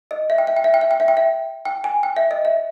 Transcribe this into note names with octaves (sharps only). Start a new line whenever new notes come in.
D#5
E5
G5
E5
G5
E5
G5
E5
G5
E5
G5
E5
G5
G#5
G5
E5
D#5
E5